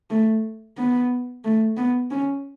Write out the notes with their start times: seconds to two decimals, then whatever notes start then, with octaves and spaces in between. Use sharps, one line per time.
0.11 A3
0.78 B3
1.45 A3
1.77 B3
2.11 C#4